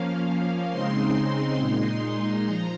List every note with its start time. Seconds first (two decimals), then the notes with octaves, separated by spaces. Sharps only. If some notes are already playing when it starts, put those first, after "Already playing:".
Already playing: F3 A#3 C#4 F5
0.70 C#3 G#3 C4 D#4 C6
1.58 A#2 G#3 D#4 C6
2.02 C6
2.46 F3 A#5